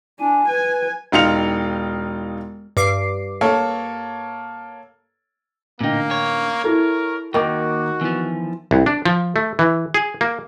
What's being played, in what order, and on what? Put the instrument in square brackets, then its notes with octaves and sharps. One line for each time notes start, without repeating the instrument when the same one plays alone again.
[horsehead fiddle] D4 [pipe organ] G#5
[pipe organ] B4 [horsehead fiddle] G#5
[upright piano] E1 D#4 F4 C#7 F7
[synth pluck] G2 D6 C7
[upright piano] A#3 A4 C#5
[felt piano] A1 D3 G5 [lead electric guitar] A#2 D#4 [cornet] A#3
[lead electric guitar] C#5
[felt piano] E4 A4 [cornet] A#4
[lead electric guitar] D#2 A#3 [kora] D#3 [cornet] F#4 [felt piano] C#6 D6
[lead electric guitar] E3 F3 [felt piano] B3
[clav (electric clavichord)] C2
D4
F3
A3
E3
G#4
A#3